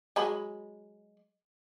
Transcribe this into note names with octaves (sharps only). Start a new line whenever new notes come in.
F#3 G#3 B5